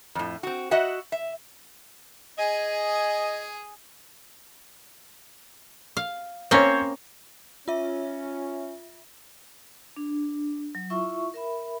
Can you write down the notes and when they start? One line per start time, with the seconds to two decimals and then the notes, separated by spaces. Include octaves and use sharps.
0.15 F2 A2
0.43 C4 F#4
0.71 F#4 D#5 E5 F#5
1.12 E5
2.38 G#4 D#5 G#5
5.97 F5
6.51 A#3 C4 C#4 C5 C#5
7.68 C#4 F4 E5
9.96 D4
10.75 F#3
10.90 E4 F4 E5 C#6
11.34 A#4 E5 B5